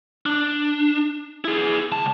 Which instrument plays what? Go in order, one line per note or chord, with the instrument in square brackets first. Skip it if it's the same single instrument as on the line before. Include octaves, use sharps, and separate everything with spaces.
[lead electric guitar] D4
E4 G#4
C#2 A5